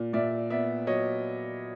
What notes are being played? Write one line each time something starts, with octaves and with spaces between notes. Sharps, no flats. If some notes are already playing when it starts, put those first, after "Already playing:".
Already playing: A#2
A#2 D5 E5
B3 D5 E5
F#3 C#5 D#5